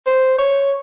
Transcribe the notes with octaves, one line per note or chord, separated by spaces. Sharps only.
C5
C#5